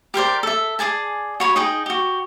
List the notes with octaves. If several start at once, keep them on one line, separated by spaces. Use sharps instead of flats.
G4 A#4 C5 D5
A4 E5
G#4 D5 G#5 A5
F#4 C#5 B5
D#4 G#4 D#5 G5
F#4 G4